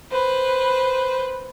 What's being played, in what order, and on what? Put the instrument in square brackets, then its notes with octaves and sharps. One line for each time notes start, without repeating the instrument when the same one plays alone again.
[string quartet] B4 C5